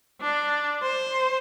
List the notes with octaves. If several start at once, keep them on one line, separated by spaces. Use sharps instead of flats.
D4
C5